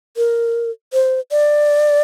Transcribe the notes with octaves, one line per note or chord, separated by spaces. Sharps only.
A#4
C5
D5